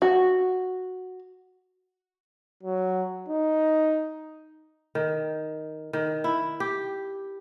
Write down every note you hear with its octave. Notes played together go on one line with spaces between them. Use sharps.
F#4
F#3
D#4
D#3
D#3
E4
G4